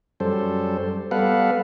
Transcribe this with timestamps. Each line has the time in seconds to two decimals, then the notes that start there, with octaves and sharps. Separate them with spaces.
0.20 F#2 G3 A4 C5
1.11 G3 B3 A4 B4 F5 F#5